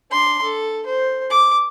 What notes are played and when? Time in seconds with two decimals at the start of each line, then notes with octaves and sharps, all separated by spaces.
0.11 D4 C6
0.42 A4
0.86 C5
1.30 D6